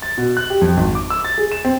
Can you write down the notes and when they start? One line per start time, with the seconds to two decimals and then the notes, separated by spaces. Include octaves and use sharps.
0.02 A6
0.17 B2
0.37 F#6
0.50 G4
0.61 F2
0.77 G#1
0.95 D6
1.10 E6
1.25 A6
1.38 G#4
1.52 E7
1.65 C4